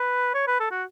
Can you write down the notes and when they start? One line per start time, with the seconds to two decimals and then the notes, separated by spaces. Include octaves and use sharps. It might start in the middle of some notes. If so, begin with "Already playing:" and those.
Already playing: B4
0.34 C#5
0.48 B4
0.60 A4
0.71 F#4